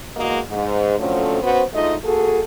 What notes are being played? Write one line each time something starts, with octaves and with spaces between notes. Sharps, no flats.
E2 G#3 A#3 F#4 D#5
G#2
D3 F3 F#3 A3 C4 C#4
B3 C#4 F#4 C5
D2 G#3 A3 D#4 F4 D#5
A#3 F#4 G#4 A4